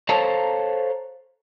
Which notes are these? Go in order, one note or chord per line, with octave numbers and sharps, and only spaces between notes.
A4 C5 C#5 F5 A5 A#5